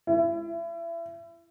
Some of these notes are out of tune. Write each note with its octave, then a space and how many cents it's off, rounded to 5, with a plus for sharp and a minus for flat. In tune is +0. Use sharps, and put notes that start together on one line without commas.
E4 +30